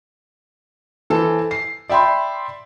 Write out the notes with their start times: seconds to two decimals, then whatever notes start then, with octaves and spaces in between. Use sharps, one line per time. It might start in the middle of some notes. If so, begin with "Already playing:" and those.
1.10 E3 A4 C5
1.51 C7
1.89 D5 E5 G5 B5 C6